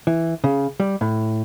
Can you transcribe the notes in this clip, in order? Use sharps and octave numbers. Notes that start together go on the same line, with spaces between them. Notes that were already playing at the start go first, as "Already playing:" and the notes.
E3
C#3
G3
A2